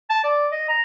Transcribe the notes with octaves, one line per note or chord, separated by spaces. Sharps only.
A5
D5
D#5
A#5